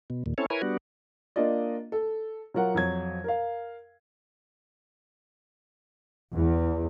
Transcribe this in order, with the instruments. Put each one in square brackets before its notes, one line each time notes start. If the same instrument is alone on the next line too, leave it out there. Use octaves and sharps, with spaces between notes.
[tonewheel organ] B2
D#2 A#2
C4 C#4 E4 A4 C#5
E4 A#4 B4 C#5 G#5
G3 B3 D4 F#4
[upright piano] A#3 D4 F4 D5 D#5
A4
F#3 F4 A#4 F#5
F2 F#3 G#6
A#4 F5
[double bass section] E2